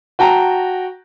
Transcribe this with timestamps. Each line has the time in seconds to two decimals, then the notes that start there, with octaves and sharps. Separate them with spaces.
0.19 F#4 G5 A5 A#5